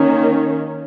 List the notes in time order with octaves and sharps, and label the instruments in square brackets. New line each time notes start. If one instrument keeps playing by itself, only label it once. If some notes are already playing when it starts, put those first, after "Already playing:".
Already playing: [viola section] D#3 A#3 C#4